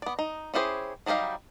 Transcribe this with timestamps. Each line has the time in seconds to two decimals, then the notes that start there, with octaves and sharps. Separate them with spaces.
0.02 B3 D5
0.19 D#4
0.54 C#4 E4 G4 G#4 C5
1.06 F#3 G3 D#4 G4 F5